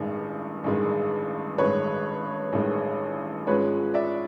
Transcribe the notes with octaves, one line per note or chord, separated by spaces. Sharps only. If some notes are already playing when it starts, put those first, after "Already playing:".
Already playing: A1 G2 D#3 G#3
A1 G2 D#3 G#3
A1 G2 D#3 G#3 B4 C#5
A1 G2 D#3 G#3
G#2 F3 G#3 C#4 B4 C#5
D5 E5